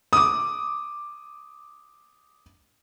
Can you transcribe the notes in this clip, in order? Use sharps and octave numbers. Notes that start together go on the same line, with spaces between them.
D6 D#6